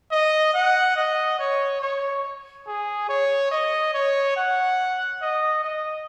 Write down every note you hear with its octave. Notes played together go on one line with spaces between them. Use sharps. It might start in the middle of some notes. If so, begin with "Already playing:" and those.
D#5
F#5
D#5
C#5
C#5
G#4
C#5
D#5
C#5
F#5
D#5
D#5